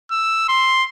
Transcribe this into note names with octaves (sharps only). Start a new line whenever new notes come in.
E6
C6